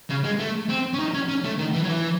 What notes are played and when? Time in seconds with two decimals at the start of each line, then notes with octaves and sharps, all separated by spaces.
0.10 C#3
0.24 G#3
0.39 A3
0.69 C4
0.94 C#4
0.99 D#4
1.14 C#4
1.29 C#4
1.44 A3
1.58 D#3
1.73 E3
1.84 F#3
1.89 E3